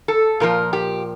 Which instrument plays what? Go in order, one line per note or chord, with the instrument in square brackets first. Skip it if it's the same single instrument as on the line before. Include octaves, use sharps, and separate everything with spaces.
[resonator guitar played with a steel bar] A4
A#2 F3 A#4
G4